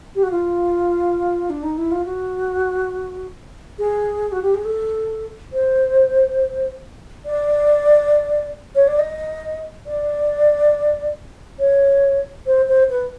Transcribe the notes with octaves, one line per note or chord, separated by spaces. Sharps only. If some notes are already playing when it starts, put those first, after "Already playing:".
G4
F#4
F4
D4
D#4
E4
F4
F#4
G#4
F#4
G4
G#4
A4
C5
D5
C#5
D5
D#5
D5
C#5
C5
C5
B4